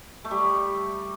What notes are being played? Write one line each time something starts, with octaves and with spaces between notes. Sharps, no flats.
A3
G3